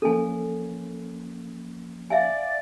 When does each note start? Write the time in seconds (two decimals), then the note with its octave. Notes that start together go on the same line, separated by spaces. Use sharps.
0.02 F3 A#3 C#4 A4 G#5
2.10 D5 E5 F5 G#5